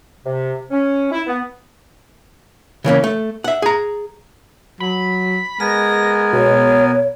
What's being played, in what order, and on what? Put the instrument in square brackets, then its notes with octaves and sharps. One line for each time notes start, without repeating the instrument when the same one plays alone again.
[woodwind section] C3
C#4
E4
B3
[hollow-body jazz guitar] C#3 E3 A#3 C#4
A3
E5 F#5
G#4 A#5
[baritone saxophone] F#3 [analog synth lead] B5
[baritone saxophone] G#3 [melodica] B3 A#4 G#5 [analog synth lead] A#6
[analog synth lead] B2 [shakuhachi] C#5